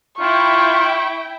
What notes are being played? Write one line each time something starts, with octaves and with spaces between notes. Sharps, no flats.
E4 F4 G5 C#6